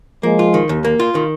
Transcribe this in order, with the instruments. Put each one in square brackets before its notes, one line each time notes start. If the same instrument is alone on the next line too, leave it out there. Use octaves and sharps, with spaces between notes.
[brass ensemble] F3 G#3 [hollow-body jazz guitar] A#3
[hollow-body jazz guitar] F4
D#3
D#2
A#3
F4
D#3